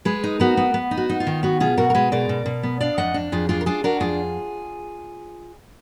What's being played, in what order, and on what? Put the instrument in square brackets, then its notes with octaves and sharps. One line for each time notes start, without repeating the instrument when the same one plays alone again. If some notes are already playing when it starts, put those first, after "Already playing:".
[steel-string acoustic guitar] G#3 G#4 B4
D#4
B3 F#4 A#4
B3
B3
D#4
F#4
D#4
F4
D#3
B3 F#4
B2 F4 G#4
B2 F#4 A#4
A#4
G#3 G#4 B4
B2 A#4 D5
B2
B2
B3
D4 D5 F5
F2 D#5 F#5
D4
F2 F4 G#4
D4 F4 G#4
A#4
D4 F4 G#4
D4 F#4 A#4
F2 F4 G#4